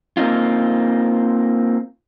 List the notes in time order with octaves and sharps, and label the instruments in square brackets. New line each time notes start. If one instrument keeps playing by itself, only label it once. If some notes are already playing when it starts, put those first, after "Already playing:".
[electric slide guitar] A#3 C4 C#4 D#4 F4